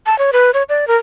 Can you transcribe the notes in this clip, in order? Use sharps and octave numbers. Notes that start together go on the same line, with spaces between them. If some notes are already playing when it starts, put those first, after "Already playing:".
A5
C#5
B4
C#5
D5
A#4